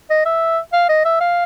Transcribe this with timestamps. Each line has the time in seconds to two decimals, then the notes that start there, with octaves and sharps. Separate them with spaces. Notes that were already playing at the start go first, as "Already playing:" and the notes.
0.10 D#5
0.25 E5
0.73 F5
0.89 D#5
1.05 E5
1.21 F5